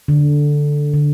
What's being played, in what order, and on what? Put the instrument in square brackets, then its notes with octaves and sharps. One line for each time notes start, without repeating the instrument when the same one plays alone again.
[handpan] D3
D3